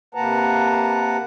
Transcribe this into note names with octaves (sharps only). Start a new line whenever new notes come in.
C3 A#3 B4 F#5 A5 A#5